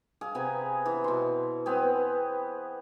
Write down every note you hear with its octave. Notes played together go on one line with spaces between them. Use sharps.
G#4 F5
C3 B3 G#5 A#5
E3
B2 C6
B3 C4 G#4